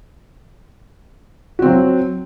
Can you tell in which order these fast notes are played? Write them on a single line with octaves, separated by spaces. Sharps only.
F#4 C4 F#3